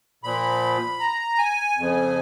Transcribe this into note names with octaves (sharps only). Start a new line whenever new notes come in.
A#2 F3 B5
A#5
G#5
F2 C#3 F3